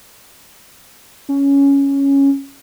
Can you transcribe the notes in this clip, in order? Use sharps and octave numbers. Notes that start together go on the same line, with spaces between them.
C#4